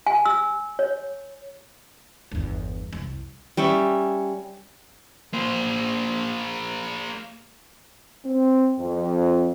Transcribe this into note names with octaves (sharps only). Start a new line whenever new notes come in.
G#5
E6
C#5
G1 E2
C2 F2
G3 C#4 C#5 E5
A#3 C5
C4
F2